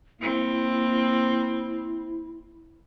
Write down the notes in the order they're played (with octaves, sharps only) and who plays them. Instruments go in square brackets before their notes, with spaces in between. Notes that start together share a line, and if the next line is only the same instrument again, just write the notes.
[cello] A#3 C4 [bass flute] E4